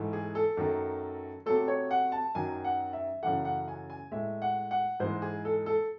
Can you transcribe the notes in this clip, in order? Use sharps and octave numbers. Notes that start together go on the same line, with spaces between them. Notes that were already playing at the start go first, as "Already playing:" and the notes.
Already playing: G#2 E3 A3
G#4
A4
F#2 D#3 A3
C3 F#3 A3 A4
C#5
F#5
A5
F#2 D#3 F#3 G#5
F#5
E5
F#2 C#3 E3 A3 F#5
F#5
G#5
G#5
A2 G#3 E5
F#5
F#5
G#2 E3 G#3 C5
G#4
A4
A4